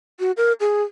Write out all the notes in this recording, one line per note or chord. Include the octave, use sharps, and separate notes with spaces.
F#4
A#4
G#4